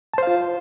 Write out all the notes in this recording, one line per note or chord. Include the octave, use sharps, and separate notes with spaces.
F4 C5 F5 A5